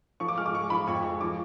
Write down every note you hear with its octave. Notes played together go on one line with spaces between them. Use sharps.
F3 C#6
D6
G#3 F6
D6
G#3 C#6
F3 B5
F2 C#6
G#3
F3 D6